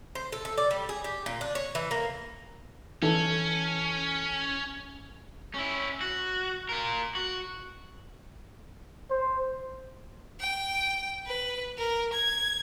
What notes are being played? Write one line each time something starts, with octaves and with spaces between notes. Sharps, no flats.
C5
A4
A4
D5
G3
G#4
G4
A#2
D4
C#5
E3
A#3
E3 C#4 A4
C#4 E4
F#4
F4 A#4
F#4
C5
G5
B4
A#4
G#6